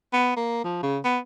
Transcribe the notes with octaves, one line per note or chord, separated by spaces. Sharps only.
B3
A#3
F3
C#3
B3